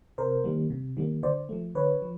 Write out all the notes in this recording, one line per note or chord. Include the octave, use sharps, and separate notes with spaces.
C3 A#4 C5
D#3 G3 A#3
C3
D#3 G3 A#3
D3 C5 D5
F3 A3
D3 B4 C#5
F3